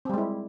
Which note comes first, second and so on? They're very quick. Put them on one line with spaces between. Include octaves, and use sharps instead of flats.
C4 G3 G#3 E4